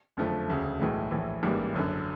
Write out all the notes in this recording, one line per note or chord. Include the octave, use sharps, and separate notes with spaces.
F#1 F2 D3 F3 A3
E1 D2 C#3
B1 A2 E3 G#3
A#1 A2 E3
A1 G#2 E3 G3 A#3
F#1 F#2 D3